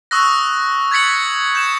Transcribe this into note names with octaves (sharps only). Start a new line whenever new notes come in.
C#6 D#6 E6 F#6 A#6
G#6 A6 B6 C#7 F#7
G6 E7